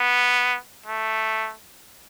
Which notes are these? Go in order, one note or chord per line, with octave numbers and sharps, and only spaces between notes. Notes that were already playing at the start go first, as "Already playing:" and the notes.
Already playing: B3
A3